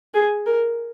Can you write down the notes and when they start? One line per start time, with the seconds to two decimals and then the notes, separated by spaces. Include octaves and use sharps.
0.14 G#4
0.46 A#4